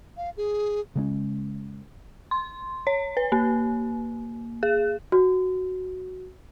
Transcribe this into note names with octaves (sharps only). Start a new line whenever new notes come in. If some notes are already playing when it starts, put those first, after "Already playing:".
F5
G#4
C#3 G#3 C#4
C6
C#5
B4
A#3
G#4
F#4